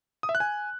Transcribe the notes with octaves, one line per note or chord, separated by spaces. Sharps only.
D#6
E5
F#6
G#5